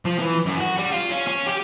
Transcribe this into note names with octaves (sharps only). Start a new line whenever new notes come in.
F3
E3
F#2
F#4
G3
F4
C#4
C#4
G4